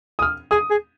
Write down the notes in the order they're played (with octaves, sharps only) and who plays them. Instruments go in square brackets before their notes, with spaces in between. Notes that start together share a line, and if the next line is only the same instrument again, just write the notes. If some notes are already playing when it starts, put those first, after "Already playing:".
[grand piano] D#6
F6
[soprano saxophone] G#4 [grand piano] D#6
[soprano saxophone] G#4